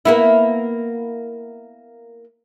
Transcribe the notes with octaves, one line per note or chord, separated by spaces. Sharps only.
A#3 B3 E4